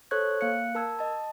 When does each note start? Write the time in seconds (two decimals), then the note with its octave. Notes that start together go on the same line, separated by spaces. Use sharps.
0.11 A4 C5 C#5 C#6 F#6 G#6
0.41 A#3 F5 F#6 C#7
0.75 A#4 A5 E6 G#6
0.99 D#5 A5